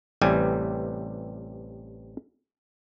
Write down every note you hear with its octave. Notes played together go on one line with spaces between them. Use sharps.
A1 C3 E3 G3 G#5